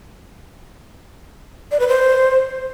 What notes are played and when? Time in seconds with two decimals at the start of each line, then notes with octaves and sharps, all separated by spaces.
1.71 D5
1.80 B4
1.88 C5